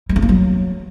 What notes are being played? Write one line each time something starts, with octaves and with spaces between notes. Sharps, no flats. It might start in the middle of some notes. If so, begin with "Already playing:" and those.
G#3
A3
A#3
F#3